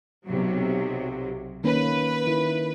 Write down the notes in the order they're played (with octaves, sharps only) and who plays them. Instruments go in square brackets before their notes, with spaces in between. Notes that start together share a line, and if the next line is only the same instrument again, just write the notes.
[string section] B1 C3 F#3
[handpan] D#3 A#3 C#4 [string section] B4
[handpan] D#3 E4